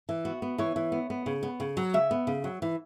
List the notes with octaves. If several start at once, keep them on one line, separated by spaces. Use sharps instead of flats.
E3
B3 F#4
B3
E3 C#5
E3
B3
B3
C#3
B3
C#3
F#3
C#3 E5
B3
C#3
F#3
E3